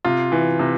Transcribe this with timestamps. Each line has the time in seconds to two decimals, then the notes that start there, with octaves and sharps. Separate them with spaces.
0.05 C3 F4
0.32 E3
0.59 C3